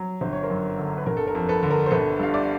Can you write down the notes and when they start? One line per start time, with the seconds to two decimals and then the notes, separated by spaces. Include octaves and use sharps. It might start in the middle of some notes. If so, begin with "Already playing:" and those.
Already playing: F#3
0.21 G1 C5
0.33 C#5
0.43 A#4 C5
0.50 F#2
0.78 D3
0.97 B4
1.06 G1 A#4
1.17 A4
1.27 A#4
1.35 F2
1.49 A4 B4
1.63 D3
1.70 A#4
1.86 C5
1.91 G1 A4 B4
2.20 G2 F5
2.34 D5 E5